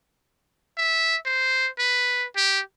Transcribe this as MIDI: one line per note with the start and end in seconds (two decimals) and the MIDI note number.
0.78 1.16 76
1.25 1.68 72
1.79 2.26 71
2.36 2.60 67